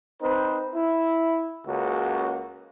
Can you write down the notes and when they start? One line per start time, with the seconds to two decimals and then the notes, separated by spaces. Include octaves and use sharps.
0.21 C4 D#4 B4 C5
0.73 E4
1.67 C#2 C#3 A#3 F#4